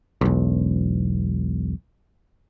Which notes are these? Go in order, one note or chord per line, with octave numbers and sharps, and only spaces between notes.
E1 B1